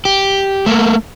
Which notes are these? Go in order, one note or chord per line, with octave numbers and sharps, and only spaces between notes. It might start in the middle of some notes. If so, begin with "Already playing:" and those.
G4
A3 A#3